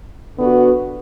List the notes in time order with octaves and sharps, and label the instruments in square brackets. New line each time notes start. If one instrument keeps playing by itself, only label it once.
[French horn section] D3 B3 F#4